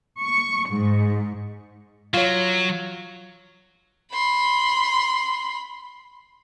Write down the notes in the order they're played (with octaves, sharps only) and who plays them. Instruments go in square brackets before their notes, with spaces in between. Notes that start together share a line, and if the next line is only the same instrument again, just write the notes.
[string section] C#6
G#2
[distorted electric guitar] F#3 [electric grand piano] F4 C#5
[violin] B5 C6